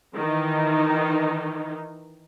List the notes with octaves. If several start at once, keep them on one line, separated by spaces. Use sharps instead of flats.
D#3 E3 D#4